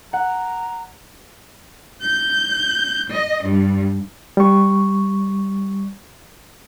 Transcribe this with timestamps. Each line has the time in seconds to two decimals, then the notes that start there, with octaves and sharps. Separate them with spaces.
0.13 F#5 A#5
2.01 G6
3.12 D#5
3.48 G2
4.37 G3 C#6